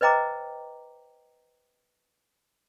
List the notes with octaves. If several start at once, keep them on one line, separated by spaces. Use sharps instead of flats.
B4 C5 D#5 G5 A#5 D6